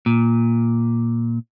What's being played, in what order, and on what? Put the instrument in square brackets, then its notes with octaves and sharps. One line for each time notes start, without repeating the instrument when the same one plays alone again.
[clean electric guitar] A#2